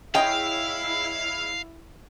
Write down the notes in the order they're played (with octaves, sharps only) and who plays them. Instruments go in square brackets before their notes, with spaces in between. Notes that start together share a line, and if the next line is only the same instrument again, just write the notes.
[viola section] E4 [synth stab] G#4 C#5 D#5 [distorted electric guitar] F5 [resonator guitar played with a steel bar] G5